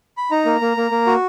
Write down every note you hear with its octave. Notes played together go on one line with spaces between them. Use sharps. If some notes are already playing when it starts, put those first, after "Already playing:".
B5
D#4 A#5
A#3
A#3
A#3
A#3
F#4